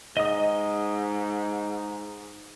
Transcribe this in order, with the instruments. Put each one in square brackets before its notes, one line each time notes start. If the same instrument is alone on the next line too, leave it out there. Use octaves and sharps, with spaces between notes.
[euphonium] G#2 [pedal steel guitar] D#5 D#6